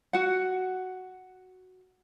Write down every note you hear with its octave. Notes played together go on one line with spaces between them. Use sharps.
F#4 F#5